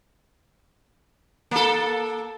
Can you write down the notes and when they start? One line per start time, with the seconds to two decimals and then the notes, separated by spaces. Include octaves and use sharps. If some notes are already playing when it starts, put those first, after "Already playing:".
1.51 A#3 A4